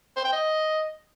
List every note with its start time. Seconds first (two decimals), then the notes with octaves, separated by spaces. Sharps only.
0.17 C5
0.25 G5
0.33 D#5